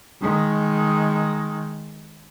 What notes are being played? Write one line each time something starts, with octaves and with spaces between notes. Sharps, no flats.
D#3 G#3